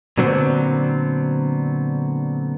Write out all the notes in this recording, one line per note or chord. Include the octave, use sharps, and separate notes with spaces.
A#2 D3 F#3 B3 C4